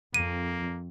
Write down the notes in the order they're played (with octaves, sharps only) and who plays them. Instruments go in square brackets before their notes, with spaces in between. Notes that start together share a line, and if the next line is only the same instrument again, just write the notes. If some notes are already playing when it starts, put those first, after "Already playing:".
[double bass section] F2 [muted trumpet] A#3 [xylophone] D#7